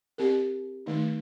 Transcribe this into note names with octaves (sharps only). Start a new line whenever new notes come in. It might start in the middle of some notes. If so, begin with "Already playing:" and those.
C4 G4 A#4
D#3 A3 D#4